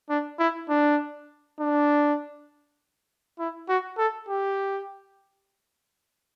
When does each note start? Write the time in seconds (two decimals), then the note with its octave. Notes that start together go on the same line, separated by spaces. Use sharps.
0.09 D4
0.39 E4
0.69 D4
1.60 D4
3.39 E4
3.69 F#4
3.98 A4
4.28 G4